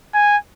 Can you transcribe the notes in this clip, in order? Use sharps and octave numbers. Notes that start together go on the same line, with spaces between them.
G#5